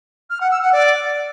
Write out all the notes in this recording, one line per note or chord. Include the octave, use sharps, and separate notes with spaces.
F6
F#5
E6
F#5
D5